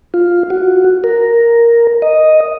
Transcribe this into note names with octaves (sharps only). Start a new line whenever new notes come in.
F4
F#4
A#4
D#5